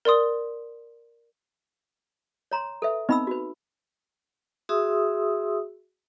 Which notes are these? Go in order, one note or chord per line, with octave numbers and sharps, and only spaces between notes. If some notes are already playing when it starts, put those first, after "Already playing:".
A#4 D5 C6 D#6
C#5 A#5 C6
A4 B4 E5
B3 C4 D#4 D#5 B5 E6
F#4 B4
F#4 G#4 E5 C6 D#6 E6